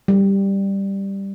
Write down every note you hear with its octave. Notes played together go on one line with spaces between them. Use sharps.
G3